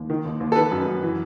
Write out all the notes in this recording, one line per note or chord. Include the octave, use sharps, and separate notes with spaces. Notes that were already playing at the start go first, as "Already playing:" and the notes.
Already playing: D#2
D#3
D#2
D#2
A4
D#3 B4
F#2
F#2
E3